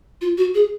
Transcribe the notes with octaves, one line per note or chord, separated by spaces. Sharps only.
F4
F#4
G#4